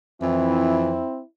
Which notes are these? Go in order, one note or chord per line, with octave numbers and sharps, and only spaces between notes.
F2 E3 C4 E4